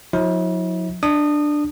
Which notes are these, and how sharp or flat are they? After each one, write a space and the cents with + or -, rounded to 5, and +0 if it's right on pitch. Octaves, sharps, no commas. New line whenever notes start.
F#3 -45 E4 -40
D4 +10 D#6 -20